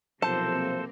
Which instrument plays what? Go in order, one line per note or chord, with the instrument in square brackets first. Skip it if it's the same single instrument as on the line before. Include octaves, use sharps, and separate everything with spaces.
[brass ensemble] B1 C3 F3 [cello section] A#3 C4 [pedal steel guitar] A4 C5 [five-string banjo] A5